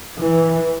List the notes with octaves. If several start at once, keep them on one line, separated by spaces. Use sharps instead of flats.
E3